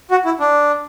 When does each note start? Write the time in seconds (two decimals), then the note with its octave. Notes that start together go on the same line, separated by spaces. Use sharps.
0.11 F#4
0.25 E4
0.40 D4